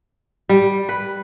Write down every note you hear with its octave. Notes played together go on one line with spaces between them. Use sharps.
G3
B4